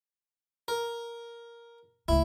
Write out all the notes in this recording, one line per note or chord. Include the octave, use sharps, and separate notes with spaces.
A#4
C#2 A3 E4